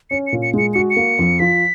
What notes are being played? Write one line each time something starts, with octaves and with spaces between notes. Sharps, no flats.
C#4 C#7
C#7
A#2
C#7
G#3 C#7
F#4 C#7
C#7
A#3
F2
F3 B6